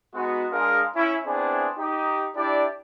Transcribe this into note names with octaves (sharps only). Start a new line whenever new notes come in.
G#3 B3 D#4 F#4
G#3 D4 G#4 A#4 F5
C#4 E4
B3 C4 D4 E4 G#4 C5
D#4 G4
D4 E4 G4 D5